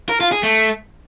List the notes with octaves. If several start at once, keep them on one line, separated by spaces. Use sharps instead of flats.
A#4
F4
G#4
A3